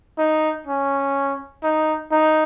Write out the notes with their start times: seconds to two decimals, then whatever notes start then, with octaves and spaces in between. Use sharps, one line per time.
0.19 D#4
0.67 C#4
1.64 D#4
2.12 D#4